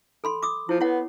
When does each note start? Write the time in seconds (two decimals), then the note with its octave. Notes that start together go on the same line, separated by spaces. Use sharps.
0.24 A4 B5 C6
0.43 D6 D#6
0.69 F3 E4
0.81 B3 E4 C#5 F#5